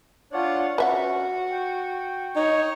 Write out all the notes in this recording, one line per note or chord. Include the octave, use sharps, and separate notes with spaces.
D4 F4 C#5 D5 F#5
C#4 F#4 B4 E5 F#5
G5
D#4 C#5